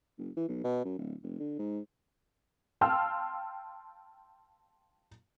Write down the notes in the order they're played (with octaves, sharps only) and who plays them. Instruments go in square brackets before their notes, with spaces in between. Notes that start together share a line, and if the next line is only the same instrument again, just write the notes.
[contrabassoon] F#1
E3
B1
B2
F#2
D1
F1
D3
G#2
[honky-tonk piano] F5 G5 A5 C6 E6 F6